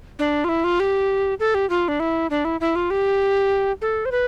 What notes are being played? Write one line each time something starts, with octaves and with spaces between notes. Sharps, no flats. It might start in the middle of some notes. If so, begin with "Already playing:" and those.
D4
F4
E4
F4
G4
A4
G4
F4
D4
E4
D4
E4
E4
F4
G4
A4
C5
B4